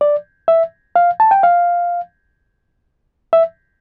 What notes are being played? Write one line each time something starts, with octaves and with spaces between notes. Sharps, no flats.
D5
E5
F5
A5
G5
F5
E5